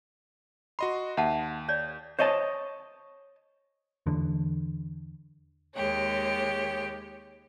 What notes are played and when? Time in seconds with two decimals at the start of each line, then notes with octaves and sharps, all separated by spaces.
0.79 F#4 D#5 B5 C6
1.17 D#2 E5 F#5 A5
1.68 C#5 D5
2.19 C5 C#5 D#5 G#5 A5
4.06 E2 D3
5.75 D#2 G#3 G4 C#5